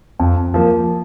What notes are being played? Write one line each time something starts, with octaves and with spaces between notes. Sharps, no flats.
F2
F3 A#3